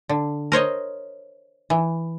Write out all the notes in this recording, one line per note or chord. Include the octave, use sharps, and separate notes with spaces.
D3
A#4 C5 C#5 D#5
E3